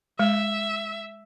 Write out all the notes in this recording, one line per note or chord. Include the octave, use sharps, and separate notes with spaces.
G#3 E5